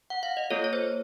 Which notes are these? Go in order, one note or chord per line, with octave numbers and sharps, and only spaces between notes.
F#5
F5
D#5
A#3 F4 A4 C#5
C#5
C5